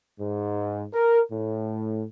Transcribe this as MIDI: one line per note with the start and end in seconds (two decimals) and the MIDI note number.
0.19 0.84 44
0.92 1.20 70
1.32 2.05 45